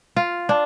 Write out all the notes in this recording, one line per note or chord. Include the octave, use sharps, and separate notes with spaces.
F4
D4